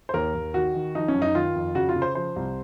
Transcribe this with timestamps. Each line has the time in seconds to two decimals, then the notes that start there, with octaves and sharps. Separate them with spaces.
0.09 C5
0.14 D#2 A#4
0.35 D#2
0.54 D#3 F#4
0.74 D#3
0.95 F3 D#4
1.08 C#4
1.14 F#2
1.22 D#4
1.35 D#3 F4
1.55 F2
1.75 C#3 F#4
1.89 F4
1.96 C#3
2.02 C5
2.15 F3 C5
2.36 C2